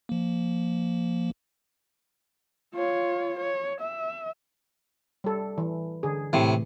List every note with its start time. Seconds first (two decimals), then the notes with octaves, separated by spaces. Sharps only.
0.09 F3 A#3
2.75 F4 C#5
3.39 C#5
3.81 E5
5.24 G3 A4
5.58 E3
6.03 D3 G#4
6.33 A2 C3 E3